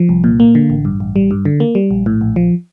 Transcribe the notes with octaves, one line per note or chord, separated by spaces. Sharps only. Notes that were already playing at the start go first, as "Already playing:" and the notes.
Already playing: F3
C2
A#2
A#3
D3
A1
G2
A1
G3
G2
D3
A#3
G3
A#1
A2
A#1
F3